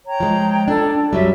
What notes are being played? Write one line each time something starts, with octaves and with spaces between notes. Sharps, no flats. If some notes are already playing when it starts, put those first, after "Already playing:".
C#5 G5 A#5
F3 G#3
D4 A4
F#2 F#3 G3 E5